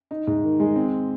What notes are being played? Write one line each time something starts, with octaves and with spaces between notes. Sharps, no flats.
D#4
G#2
D#3
G#3
C4